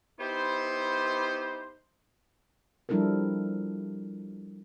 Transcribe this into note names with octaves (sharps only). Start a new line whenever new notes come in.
B3 D#4 E4 G4 C5
F3 G3 D4 E4 A4 A#4